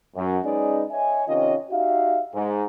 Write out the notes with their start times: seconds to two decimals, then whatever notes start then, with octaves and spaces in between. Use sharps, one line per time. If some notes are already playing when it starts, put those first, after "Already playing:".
0.16 F#2
0.45 G#3 C#4 D#4 G#4 B4 D5
0.91 C#5 D#5 E5 G#5
1.28 C3 D#3 C#4 F4 C#5 D#5
1.71 D#4 F#4 G4 E5 F5
2.34 G#2